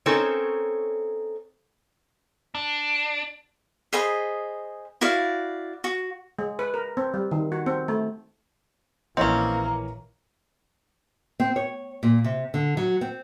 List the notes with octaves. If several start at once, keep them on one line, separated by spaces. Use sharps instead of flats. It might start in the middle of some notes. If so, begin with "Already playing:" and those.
C4 C#4 D#4 A4 A#4 C#5
D4
G#4 C5 D#5 B5
E4 F#4 D5 F5
F#4
G#3
B4
A#4
C4
G3
D#3
F#4
C4
A3
A#1 E3 A#3 C4 C#4 C#5 D#5
C4
C#5
A#2
C3
D3
F#3
C4